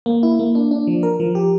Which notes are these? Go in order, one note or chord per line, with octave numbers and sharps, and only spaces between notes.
A#3
E4
A#3
D4
D4
F3
A#4
F3
G4